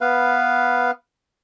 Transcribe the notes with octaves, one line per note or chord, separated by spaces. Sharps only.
B3 B4 F5